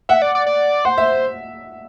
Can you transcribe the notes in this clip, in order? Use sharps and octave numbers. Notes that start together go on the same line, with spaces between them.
E5 F#5
D5
D5
D5
C5 F#5
E5